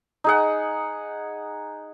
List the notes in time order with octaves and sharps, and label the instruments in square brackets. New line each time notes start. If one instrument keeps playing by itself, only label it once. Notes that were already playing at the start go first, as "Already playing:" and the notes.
[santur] D#4 G#4 F#5